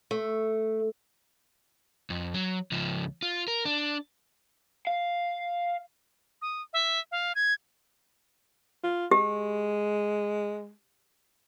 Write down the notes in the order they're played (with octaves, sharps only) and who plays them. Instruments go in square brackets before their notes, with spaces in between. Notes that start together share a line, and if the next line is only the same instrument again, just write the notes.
[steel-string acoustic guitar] A3
[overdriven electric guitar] F2
F#3
C#2 F3
F4
A#4
D4
F5
[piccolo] D#6
E5
F5
G#6
[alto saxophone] F4
[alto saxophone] G#3 [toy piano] G4